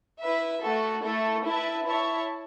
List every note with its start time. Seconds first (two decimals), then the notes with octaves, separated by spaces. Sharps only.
0.20 E4 B4 E5
0.62 A3 F#4 A4
1.04 A3 E4 A4
1.45 E4 B4 E5 A5
1.86 E4 C#5 E5 A5